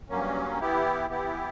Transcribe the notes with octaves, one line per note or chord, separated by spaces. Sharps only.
G2 F#3 A#3 C#4
E3 B3 E4 G4
E3 B3 E4 G4